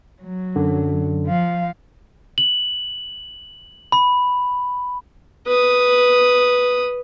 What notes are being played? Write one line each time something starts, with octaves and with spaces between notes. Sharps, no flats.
F#3
F#2 D3
F3 F5
F#7
B5
B4 D#6